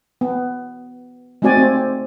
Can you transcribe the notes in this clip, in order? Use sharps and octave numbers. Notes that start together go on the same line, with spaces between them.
B3
G#3 A3 C4 F#4 D5 G#5
C4